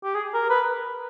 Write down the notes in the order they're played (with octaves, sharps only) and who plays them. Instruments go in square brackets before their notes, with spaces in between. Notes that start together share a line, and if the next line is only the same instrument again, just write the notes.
[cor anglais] G4
G#4
A#4
B4